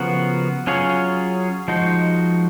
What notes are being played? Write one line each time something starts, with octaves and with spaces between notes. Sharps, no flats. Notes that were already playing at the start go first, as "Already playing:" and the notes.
Already playing: C#3 F3 B3 F#4 A#4
F#3 C#4 F4 G#4 C#5
F3 G#3 D#4 F#4